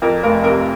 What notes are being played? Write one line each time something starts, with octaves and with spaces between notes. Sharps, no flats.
F2 A#4
F1 A#4
C3 A#4